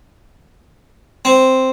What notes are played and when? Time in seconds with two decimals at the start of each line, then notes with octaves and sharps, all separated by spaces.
1.25 C4